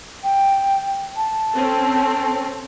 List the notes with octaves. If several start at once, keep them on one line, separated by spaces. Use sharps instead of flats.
G5
A5
C4 C#4 A4